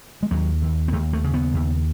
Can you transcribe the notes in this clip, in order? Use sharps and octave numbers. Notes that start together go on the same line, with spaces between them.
G#3
D#2 F#3
D#2
B3
D#2 A3
A3
C#3
B3
D#2